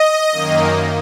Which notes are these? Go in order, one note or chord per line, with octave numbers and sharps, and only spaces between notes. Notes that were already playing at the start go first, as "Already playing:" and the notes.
Already playing: D#5
F#2 D#3 A#3